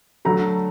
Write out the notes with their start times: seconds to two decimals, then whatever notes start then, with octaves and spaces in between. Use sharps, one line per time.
0.25 D3 F#3 A3 A#5